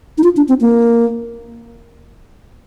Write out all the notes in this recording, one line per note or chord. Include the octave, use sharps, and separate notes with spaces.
D#4
F4
D4
C4
A#3